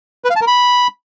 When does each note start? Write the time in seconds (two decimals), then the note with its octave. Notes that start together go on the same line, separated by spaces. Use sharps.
0.24 B4
0.30 F5
0.36 A5
0.41 A#4
0.47 B5